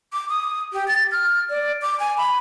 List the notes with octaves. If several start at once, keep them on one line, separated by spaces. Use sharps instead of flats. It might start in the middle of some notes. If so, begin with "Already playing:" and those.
D6
D#6
G4
A6
F6
D5
D6
G#5
B5